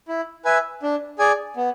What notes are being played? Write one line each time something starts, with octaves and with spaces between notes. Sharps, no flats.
E4
B4 E5 G#5
D4
G#4 D5 G#5
B3